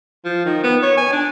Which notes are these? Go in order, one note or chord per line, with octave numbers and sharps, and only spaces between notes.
F3
D#3
B3
C#5
G#5
D4